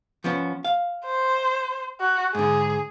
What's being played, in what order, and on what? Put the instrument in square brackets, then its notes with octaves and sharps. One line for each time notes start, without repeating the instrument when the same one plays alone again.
[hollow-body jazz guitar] F3 B3 C#4
F5
[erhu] C5
F#4
[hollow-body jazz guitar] G#2 D3 [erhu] G#4